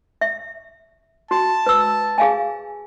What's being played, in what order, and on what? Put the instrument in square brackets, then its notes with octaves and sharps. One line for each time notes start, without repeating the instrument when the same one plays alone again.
[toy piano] E5
[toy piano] F#4 [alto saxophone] A5
[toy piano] B4 E6
G#4 F5 G#5